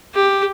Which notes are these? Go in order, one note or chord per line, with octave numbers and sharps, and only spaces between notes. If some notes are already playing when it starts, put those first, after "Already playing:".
G4